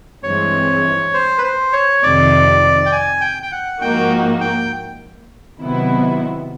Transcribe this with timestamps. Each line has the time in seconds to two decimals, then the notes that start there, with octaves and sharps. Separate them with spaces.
0.23 G2 E3 G#3 C4 C#5
1.14 C5
1.38 B4
1.44 C5
1.73 C#5
2.03 F2 C3 D#3 D5
2.86 G5
2.92 G#5
3.21 G5
3.43 G5
3.52 F#5
3.81 G#2 F3 A#3 D#4 F#4 G5
4.41 G5
5.60 C3 D#3 F#3 B3 E4